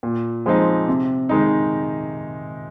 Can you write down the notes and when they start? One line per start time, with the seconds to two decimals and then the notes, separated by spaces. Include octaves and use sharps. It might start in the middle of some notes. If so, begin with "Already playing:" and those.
0.03 A#2
0.46 F3 G#3 C4 D#4
0.88 C3
1.29 D#3 G#3 D#4